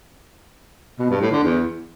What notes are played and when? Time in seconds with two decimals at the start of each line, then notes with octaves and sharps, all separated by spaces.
0.99 B2
1.10 G2
1.21 A2
1.32 D3
1.43 E2